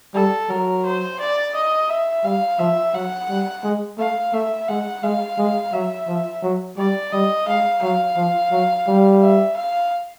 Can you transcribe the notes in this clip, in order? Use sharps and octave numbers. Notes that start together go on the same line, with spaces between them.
G3 A4
F#3 A#4
C5
D5
D#5
E5
G3 F5
F3 E5
F#3 F#5
G3
G#3
A3 F5
A3 E5
G#3 F#5
G#3 F5
G#3
F#3 E5
F3
F#3
G3 D5
G3 D#5
G#3 F5
F#3 F5
F3
F#3
G3
E5
F5